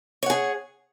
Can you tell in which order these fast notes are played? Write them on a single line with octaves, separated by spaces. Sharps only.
C#5 F#5 G#4